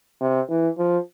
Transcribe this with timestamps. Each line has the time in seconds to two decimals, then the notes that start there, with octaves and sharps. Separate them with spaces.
0.21 C3
0.49 E3
0.78 F3